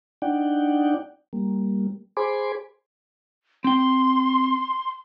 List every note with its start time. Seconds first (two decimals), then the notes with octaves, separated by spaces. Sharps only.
0.22 D4 D#4 D5 F#5 G5
1.33 G3 A#3
2.17 G#4 C5 G#5 B5 C6 D6
3.64 C4 G5 C6